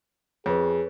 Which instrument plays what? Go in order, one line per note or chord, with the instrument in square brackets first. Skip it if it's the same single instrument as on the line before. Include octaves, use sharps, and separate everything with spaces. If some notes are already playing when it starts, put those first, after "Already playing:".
[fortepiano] F2 [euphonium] G#4 [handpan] B4 C#5